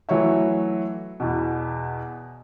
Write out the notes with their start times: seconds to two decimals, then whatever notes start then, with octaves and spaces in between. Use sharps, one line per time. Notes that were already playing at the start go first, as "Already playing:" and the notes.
0.09 E3 F#3 A3 C#5 E5
1.20 E2 B2